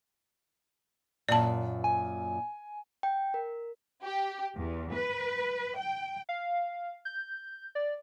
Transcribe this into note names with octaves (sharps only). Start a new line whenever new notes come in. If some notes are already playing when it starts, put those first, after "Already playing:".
F#2 A#2 D5 A5
G#5
G5
A#4
G4
E2
B4
G5
F5
G6
D5